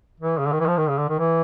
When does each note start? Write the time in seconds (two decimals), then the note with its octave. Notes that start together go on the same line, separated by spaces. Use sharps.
0.20 E3
0.39 C#3
0.46 D3
0.52 D#3
0.60 E3
0.67 F3
0.77 D#3
0.88 C#3
0.98 D3
1.09 D#3
1.19 E3